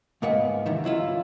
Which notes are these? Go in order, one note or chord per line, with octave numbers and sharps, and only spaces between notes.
C#2 G#2 A#3 B3 F#5
C3 D#3 E3
C#2 F#3 E4 F4